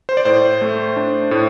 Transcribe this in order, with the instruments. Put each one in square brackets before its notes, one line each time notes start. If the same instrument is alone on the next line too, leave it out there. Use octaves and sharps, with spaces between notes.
[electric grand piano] C5
D5
A2 C5
A3
D4
A2